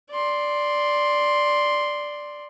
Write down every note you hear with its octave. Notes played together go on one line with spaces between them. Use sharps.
D5 C6